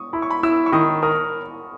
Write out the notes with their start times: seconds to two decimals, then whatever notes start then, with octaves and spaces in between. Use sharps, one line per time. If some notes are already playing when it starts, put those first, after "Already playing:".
Already playing: C#6 D#6
0.13 E4 B5
0.22 C#6
0.30 B5
0.43 E4 E6
0.66 C#6
0.72 D#3 D#6
1.02 A#4 D#6